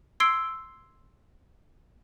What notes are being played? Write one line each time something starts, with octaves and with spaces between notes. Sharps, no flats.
C6 E6 G#6 C7 D7 G7